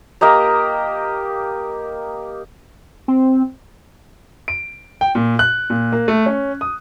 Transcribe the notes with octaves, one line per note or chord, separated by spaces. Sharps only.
A#3 G4 D#5 A#5
C4
D7
G5
A#2
F#6
A#2
A#3
A3
C#4
D#6